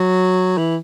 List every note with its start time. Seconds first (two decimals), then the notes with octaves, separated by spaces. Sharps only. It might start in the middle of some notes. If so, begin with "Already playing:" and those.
Already playing: F#3
0.58 E3